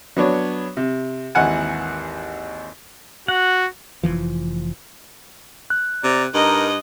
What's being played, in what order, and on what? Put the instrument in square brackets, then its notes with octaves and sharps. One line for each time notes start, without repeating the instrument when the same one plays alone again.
[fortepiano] F#3 B3 D4 C#5
C3
G#1 D#2 E3 F#5 G#5
[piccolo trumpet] F#4 [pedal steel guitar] F#5
[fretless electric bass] F1 E2 E3 F3
[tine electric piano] F#6
[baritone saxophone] C3 [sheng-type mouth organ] D5 A#5
[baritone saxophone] G2 [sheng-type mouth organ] D#4 A#4 [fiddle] D#5